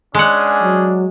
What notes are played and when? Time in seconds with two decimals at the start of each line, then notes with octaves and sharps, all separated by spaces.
0.15 G#3 C#4 D4 G#4 F#5
0.62 F#3